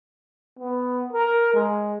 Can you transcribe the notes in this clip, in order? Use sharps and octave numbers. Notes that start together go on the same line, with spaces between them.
B3
A#4
G#3